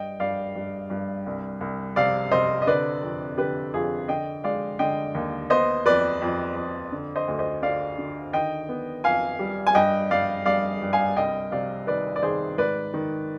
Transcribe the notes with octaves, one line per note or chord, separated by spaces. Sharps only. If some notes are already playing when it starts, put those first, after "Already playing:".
Already playing: G2 D#5 G5
G2 D5 F5
G2
G2
C2
C2
C3 D5 F5
C3 C5 D#5
D#5
D3 B4 D5
F2
D3 G4 B4
F2 F4 G#4
D3 D#5 G5
G#3 D5 F5
D3 D#5 G5
D#2
B3 C5 D#5
F2 B4 D5
F2
F2
D3
C5 D#5
D2
C5 D#5
D3 D5 F5
D3
D#3 D#5 G5
B3
F2 F5 G#5
G3
G#5
G2 D#5 G5
G2 D5 F5
G2 D5 F5
G2
F5 G#5
C2 D#5 G5
C3 D5 F5
D#3 B4 D5
D5
D#3 G#4 C5
G#2 B4 D5
D#3